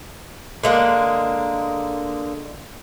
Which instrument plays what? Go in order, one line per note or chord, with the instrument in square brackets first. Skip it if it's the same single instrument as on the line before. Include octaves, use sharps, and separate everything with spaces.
[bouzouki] D3 G#3 A#3